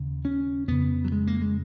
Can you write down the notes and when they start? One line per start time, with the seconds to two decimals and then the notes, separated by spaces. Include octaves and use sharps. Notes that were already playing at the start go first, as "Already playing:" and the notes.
Already playing: D#2 C#3
0.25 C#4
0.68 F2 C#3 B3
1.05 F#3
1.12 G#3
1.27 A#3
1.41 G#3